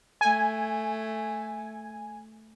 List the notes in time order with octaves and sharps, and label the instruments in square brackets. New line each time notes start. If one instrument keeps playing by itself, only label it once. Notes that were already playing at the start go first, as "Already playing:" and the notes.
[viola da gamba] A3 [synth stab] G#5